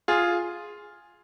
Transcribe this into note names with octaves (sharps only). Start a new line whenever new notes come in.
F4 G#4